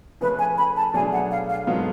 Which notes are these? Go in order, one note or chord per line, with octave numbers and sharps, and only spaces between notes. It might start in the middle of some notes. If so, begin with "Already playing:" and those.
C#3 F3 A3 C#4 G#4 B4
G#5
B5
A5
B2 F#3 A3 D4 G#4 G#5
F#5
F5
F5
G#2 F#3 B3 F4 A4